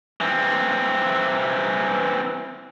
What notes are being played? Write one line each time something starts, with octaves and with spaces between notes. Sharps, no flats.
E3 C4